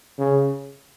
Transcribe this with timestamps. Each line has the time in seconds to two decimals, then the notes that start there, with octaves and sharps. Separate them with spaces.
0.18 C#3